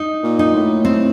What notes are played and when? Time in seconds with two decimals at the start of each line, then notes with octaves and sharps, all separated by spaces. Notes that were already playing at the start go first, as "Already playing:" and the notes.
Already playing: D#4
0.23 A#2
0.39 D#4
0.54 A2
0.85 C4